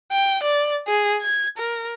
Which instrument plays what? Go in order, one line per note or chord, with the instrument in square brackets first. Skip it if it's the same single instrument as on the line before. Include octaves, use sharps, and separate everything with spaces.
[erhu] G5
D5
G#4
G#6
A#4